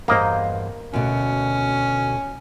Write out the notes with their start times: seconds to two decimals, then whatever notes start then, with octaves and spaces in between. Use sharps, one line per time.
0.08 E2 G2 A#3 C5 D#5
0.93 D2 B2 C#4